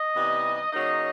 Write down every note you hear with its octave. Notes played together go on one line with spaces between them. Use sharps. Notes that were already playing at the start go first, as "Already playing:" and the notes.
Already playing: D#5
C3 E3 G3 B3 D#4
C#3 F#3 A#3 D#4 D#5